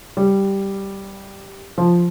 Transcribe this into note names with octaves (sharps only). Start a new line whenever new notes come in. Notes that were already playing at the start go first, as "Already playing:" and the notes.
G3
F3